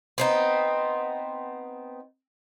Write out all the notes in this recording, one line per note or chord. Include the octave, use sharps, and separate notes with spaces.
B3 C4 D#4